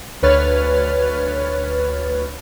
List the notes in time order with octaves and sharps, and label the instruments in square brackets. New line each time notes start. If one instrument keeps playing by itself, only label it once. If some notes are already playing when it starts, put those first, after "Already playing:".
[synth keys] D2 B4 C#5 F6 A6